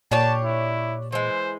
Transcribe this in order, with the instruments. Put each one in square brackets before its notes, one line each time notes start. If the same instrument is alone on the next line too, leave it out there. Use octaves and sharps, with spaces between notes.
[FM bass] A#2 [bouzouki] D4 G4 C#5 [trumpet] A5
[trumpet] E4
[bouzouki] E3 G#3 [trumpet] C5